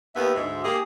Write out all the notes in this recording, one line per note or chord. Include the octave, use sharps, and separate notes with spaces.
D#2 B3 E5
D2 G#2
A#3 G4 G#4 D#6